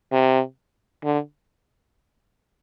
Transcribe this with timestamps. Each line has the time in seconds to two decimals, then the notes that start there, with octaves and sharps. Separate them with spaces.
0.12 C3
1.04 D3